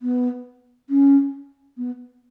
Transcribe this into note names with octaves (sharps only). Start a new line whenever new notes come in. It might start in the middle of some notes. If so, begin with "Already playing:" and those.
B3
C#4
B3